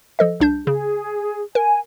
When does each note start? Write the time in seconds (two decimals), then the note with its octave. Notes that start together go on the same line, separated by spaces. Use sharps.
0.19 F3 A4 D#5
0.40 C2 D4 G6
0.67 C#3 G#4
1.55 A#4 G#5